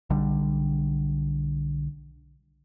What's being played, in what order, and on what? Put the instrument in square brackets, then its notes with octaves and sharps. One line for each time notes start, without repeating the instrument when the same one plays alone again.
[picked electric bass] B1 D3 G3